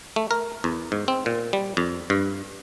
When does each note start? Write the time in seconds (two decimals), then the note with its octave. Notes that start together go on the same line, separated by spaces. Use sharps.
0.16 A3
0.31 A#4
0.64 E2
0.92 G#2
1.08 C4
1.26 A#2
1.53 G3
1.77 F2
2.10 G2